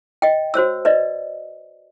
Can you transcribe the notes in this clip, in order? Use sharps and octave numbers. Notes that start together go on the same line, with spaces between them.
D#5 G5
F#4 C5 C#5 E6
B4 D5 D#5